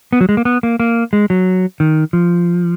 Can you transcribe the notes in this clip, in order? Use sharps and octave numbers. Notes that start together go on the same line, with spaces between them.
B3
F#3
G#3
A#3
B3
A#3
A#3
G#3
F#3
D#3
F3